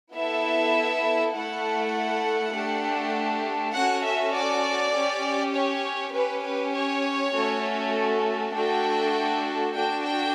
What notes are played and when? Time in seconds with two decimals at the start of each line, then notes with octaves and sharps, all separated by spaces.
0.14 B3 E4 A4 E5
1.34 A3 E4 A4 F#5
2.54 A3 D4 G4
3.75 C#4 F#4 A4 F#5
4.04 E5
4.34 D5
4.95 C#4 G4
5.54 C#5
6.14 C#4 G4 B4
6.44 B4
6.74 C#5
7.34 A3 C#4 F#4 A4
8.54 A3 D4 F#4 A4 G5
9.75 D4 F#4 A4 G5
10.05 G5